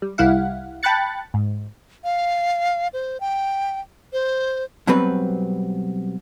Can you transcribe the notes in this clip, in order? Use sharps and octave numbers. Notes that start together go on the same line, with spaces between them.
G3
C2 G3 E4 F5 F#5
G5 A5 B5 F#6 A6 C#7
G#2
F5
C5
G5
C5
B2 F#3 G3 C4 B4